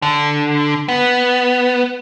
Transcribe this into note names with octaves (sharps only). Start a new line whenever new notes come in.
D3
B3